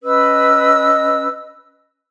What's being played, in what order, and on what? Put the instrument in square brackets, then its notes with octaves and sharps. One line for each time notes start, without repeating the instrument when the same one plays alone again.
[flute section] C#4 B4 D#5 E6